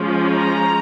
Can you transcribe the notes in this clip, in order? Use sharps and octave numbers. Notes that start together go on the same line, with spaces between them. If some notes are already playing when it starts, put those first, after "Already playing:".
Already playing: F3 G#3 C#4
A#5